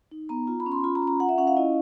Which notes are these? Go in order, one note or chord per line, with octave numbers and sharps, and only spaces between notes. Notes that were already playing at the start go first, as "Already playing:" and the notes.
D#4
B3 A#5
F4 A#5
B5
C#4
C6
F4 B5
A#5
C#4
A#5
F4 F#5
E5
C#4 F#5
F5
E4 D#5